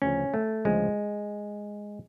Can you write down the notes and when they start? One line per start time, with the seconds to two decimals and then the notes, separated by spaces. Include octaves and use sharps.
0.02 D2 C#3 F3 C#4
0.34 A3
0.65 D2 C#3 F3 G#3